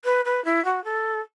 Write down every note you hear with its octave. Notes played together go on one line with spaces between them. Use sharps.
B4
B4
E4
F#4
A4